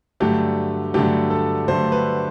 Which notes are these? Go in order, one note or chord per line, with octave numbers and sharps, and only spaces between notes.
G2 D3 F#3 A3 G4
G2 D3 F#3 A3 G4
A4
G2 D3 F#3 A3 C5
B4